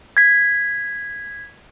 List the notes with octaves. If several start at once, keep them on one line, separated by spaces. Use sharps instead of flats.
G#6 B6